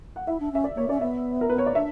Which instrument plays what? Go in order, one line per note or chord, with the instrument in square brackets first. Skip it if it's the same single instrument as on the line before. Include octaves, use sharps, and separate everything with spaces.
[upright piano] F#5
[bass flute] E4 [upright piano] E5
[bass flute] D4
[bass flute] C#4 [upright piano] E5
[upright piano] D5
[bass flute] A#3 [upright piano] C#5
[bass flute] C#4 [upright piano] D5
[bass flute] B3 [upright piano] E5
[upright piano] A#4
B4
C#5
D5
[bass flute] D4 [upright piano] E5